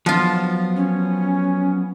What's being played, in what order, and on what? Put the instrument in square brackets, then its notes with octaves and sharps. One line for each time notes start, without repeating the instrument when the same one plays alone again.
[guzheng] F3 F4 [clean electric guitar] F#3 B3 F5
[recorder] C#4